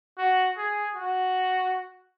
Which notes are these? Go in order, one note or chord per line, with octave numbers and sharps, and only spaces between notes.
F#4
G#4
F#4